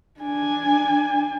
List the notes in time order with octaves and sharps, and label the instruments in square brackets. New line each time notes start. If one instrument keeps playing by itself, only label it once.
[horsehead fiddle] D4 G#5